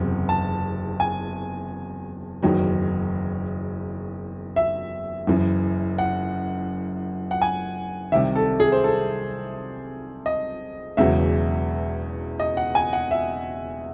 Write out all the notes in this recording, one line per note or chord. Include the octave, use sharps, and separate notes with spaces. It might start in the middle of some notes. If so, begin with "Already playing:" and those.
Already playing: F#1 E2 C3 F#3
A5
G#5
F#1 E2 D#3 F#3
E5
F#1 F#2 E3
F#5
F#5
G#5
C2 C3 D#3 E5
A4
G#4
C5
A4
D#5
E1 E2 C#3 F#3 E5
D#5
F#5
G#5
F#5
E5